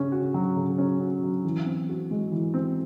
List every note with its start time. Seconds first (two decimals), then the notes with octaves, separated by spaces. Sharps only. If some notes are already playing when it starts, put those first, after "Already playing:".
Already playing: C#3 C#4
0.12 F#4
0.34 F#3
0.56 C#3
0.78 C#4
1.00 F#4
1.23 F#3
1.45 E3
1.66 C4
1.89 F#4
2.11 G#3
2.32 E3
2.54 C4